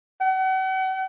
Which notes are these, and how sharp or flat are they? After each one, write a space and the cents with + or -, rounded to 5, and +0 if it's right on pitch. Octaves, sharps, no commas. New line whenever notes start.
F#5 +40